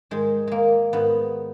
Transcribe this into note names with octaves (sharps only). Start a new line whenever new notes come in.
G#2 D#3 G#3
G#3 A#3
G#2 D#3 B3